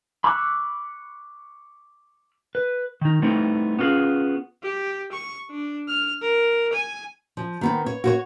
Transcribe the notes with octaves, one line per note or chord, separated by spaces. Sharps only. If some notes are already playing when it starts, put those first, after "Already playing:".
B5 C#6 D6 E6 F#6
B4
D#3 D#4
G3 A3 B3 C4 D#4 E4
B3 C#4 F4 F#4 G#4
G4
C#6
D4
F6
A#4
G#5
F3
D#3 B3 C4
C#5
F#4 C5 C#5